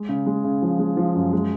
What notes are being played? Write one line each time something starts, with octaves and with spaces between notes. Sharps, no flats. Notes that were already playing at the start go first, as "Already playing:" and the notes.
Already playing: G#3
C#3
G#3
C#3
F3
G#3
F3
F#2
G#3